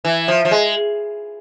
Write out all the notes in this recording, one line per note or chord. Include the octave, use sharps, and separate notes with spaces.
E3
F3
F3
G#3